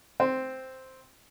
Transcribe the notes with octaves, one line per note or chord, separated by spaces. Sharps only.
C4